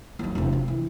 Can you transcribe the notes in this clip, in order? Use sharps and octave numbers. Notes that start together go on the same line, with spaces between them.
D#2 F#3
E1 C3
F3
E3